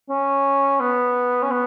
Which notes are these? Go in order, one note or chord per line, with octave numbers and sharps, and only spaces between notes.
C#4
B3
C#4
B3